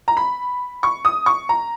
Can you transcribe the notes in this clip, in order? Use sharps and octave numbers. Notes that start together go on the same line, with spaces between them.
A#5
B5
C#6
D#6
C#6
A#5